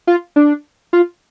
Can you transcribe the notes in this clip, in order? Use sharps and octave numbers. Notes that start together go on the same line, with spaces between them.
F4
D4
F4